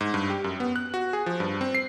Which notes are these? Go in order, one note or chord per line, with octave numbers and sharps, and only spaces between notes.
G#2
G2
G4
F#2
B3
F#6
F#4
G#4
F3
G2
C4
C7